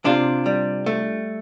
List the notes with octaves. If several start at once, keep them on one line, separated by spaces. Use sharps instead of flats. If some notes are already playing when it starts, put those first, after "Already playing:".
C3 D4 F4
G3
A3